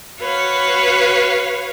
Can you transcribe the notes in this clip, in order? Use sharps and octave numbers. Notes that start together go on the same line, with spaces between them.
F#4 B4 C#5 F5